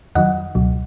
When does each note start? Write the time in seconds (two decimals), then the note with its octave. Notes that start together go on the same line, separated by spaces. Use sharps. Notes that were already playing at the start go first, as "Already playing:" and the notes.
0.15 F2 D#3 F#3 D#5 F#5
0.55 C#2 B2 F#3